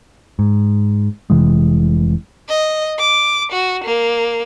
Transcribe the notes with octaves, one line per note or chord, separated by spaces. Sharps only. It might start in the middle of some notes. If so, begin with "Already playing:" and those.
G#2
F1 C3 E3 G#3
D#5
D6
F#4
A#3